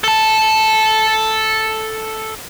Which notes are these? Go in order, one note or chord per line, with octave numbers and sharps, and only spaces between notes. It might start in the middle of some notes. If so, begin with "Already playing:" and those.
A4 A5